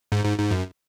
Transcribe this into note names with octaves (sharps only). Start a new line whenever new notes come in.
G#2
G#2
G#2
F#2